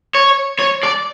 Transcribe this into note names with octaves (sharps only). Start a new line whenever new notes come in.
C#5
C#5
D5